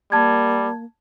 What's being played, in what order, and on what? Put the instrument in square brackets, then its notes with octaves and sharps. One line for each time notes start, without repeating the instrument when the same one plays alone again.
[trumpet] G3 [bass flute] A#3 [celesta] A5 G#6